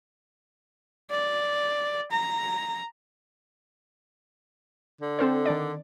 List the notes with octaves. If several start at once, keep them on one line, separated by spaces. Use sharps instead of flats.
D5
A#5
D3
C4 A4 C5
D#3 D4 D5